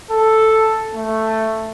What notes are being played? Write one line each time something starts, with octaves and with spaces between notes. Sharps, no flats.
A4
A3